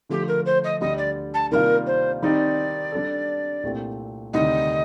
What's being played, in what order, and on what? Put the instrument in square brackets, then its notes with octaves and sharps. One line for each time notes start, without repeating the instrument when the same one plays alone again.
[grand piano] D3 F3 A3 [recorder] G4
[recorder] A#4
C5
D#5
[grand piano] D2 D3 G3 D4 G4 [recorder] D#5
[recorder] D5
A5
[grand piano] C3 D#3 G3 A#3 F4 [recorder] A#4
[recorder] C5
[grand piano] D#3 G3 C4 D#4 G4 [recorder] D5
[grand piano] G3 D4 A4
C2 A#2 A3 C4 G4
[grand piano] D2 C3 D#3 G3 [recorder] D#5